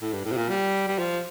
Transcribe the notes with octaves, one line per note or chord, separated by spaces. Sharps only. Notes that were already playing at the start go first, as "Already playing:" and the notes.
A2
G2
A2
C3
A#2
G3
G3
F3